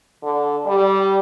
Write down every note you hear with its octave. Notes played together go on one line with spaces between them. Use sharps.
D3
G3